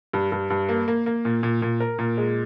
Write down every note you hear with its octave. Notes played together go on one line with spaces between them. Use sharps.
G2
G2
G2
A#3
A#3
A#3
A#2
A#2
A#2
A#4
A#2
G#3